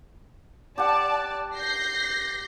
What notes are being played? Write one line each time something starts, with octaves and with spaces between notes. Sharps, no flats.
G4 D5 F#5 A5
G6 A#6 C7